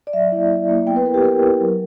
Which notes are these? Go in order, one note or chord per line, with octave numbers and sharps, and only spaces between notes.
D5
F#3 E5
A#3 E4
F#3
A#3 E4
B3 G5
B4
E4 A#4
G4
B3 A#4
E4
F#3